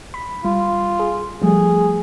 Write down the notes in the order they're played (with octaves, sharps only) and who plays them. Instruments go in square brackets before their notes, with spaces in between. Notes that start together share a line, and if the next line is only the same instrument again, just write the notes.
[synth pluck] B5
[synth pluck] G3 [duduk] F4
[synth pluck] G#4
[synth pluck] F3 G3 A3 [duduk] G#4